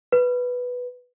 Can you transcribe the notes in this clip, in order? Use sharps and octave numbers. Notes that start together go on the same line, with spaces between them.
B4